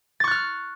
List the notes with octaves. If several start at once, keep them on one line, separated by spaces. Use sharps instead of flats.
C#6 F6 F#6 A6